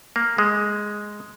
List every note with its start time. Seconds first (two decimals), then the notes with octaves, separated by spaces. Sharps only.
0.16 A#3
0.38 G#3